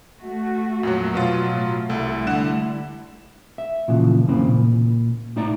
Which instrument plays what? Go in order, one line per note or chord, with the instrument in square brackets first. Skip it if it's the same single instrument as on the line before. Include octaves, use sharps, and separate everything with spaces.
[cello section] A3 F#4
[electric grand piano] F2 A#2 F#3
B2 F#3 F4
[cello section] A2
[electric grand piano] C2 A4 [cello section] G3 A3 E4
[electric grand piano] D3 F#5 E7
[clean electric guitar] E5
A#2 C#3 E3 F3
F#2 C#3 E3 A#3 C4 B5
A#2
A2 D#4 E4 D5 A#5